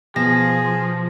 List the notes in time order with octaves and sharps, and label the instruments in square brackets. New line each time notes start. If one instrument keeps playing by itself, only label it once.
[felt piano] B2 [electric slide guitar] F3 [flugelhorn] G#4 [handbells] A#6